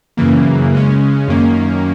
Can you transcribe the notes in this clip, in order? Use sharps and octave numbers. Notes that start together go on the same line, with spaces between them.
F#2 C#3 E3 A#3
C#3 G#3 C#4
F#2 D#3 A#3 C#4